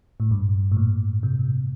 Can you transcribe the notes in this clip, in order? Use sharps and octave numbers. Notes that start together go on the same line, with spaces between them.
A2
G2
A2
A#2
C3